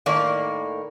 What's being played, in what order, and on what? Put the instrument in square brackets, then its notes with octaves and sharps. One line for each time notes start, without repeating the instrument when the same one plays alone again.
[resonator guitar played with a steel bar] A2 D#3 A#3 D5